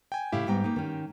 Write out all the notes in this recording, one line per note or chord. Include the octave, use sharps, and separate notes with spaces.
G5 G#5
A2 C#3 E4 G4 F5
G#2 G3 B3 G4 G5 A#5
A#3 D#4
D#3 C#4